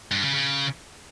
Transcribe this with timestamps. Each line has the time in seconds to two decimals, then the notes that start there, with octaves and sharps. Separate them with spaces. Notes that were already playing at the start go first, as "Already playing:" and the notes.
0.12 G2
0.23 C#3
0.34 C#3